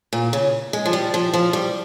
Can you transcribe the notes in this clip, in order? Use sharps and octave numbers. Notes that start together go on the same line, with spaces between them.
A#2
C#3
G#3
F3
G3
F3
F3
G3